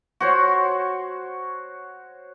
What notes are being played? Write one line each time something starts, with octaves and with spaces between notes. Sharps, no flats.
F#4 C5 C#5